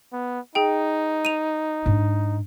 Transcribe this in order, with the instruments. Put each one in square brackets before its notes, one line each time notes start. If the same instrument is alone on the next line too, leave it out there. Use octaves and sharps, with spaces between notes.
[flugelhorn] B3
[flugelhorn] D#4 [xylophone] G#4 G5
[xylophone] D#7 F7
[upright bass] G#2 D4